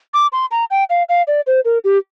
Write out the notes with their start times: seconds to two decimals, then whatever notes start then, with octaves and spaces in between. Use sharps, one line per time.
0.14 D6
0.32 C6
0.51 A#5
0.71 G5
0.90 F5
1.09 F5
1.27 D5
1.47 C5
1.65 A#4
1.84 G4